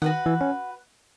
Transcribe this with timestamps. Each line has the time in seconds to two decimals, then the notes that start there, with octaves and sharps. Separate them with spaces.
0.02 D#3 F#4 B4 F#5
0.26 E3
0.41 C#4